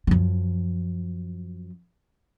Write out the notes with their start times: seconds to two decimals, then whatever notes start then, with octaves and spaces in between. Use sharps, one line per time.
0.07 F#2 F3